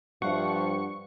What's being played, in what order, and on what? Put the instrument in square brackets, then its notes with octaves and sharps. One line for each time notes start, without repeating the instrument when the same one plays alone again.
[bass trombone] G2 [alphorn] F3 [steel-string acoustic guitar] F5 F#5 [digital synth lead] C#6